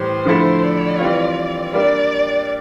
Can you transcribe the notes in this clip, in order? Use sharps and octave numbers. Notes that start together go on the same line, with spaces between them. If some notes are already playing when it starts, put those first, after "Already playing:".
Already playing: A2 E3 G3 C5
D3 F3 A3 E4 A4
D5
E3 G3 C4 F4
G3 A#3 D4 D5